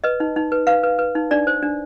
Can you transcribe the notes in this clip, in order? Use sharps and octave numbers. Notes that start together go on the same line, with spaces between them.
B4 D#5
D#4
D#4
B4
B4 F5
B4
B4
D#4
D4 D5
C5
D4